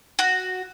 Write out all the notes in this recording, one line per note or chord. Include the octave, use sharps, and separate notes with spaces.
F#4